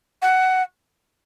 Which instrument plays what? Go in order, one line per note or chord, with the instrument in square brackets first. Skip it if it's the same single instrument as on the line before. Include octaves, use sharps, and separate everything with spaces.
[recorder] F#5